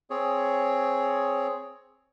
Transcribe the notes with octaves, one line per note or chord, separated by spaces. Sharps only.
C4 G#4 C#5